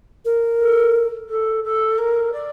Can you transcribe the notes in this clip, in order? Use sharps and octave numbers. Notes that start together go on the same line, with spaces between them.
A#4
A4
A4
A4
A#4
D5